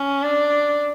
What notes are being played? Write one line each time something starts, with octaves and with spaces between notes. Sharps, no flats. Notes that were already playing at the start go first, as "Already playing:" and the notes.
Already playing: C#4
D4